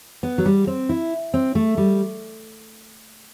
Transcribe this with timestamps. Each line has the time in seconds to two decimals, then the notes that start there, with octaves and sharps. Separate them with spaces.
0.23 B3
0.38 F#3
0.46 G3
0.67 C4
0.89 E4
1.34 C4
1.55 A3
1.78 G3